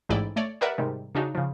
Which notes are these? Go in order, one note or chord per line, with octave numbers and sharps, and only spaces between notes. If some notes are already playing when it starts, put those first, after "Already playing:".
A1 G#2 G#3 E4 D5 G5
A3 C#5 D5
G4 A#4 B4 D5 E5 F#5
G#2 C3 D#3 G3
C#3 D4 D#4 F#4
C#3 F3